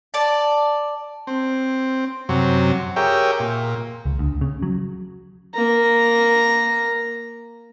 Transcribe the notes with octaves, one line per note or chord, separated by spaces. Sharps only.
D5 A5
C4
F#2 C3 F#3
G4 G#4 A#4 C#5 E5 G5
A#2
C#2
D2
C#3
F#3
A#3 A#5